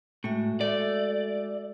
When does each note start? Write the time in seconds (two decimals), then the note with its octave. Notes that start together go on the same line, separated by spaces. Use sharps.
0.24 A2 G#3 F#4 E5
0.61 A3 D5